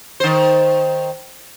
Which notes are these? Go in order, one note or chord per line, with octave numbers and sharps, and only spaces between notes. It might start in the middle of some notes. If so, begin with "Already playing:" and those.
D#3 C5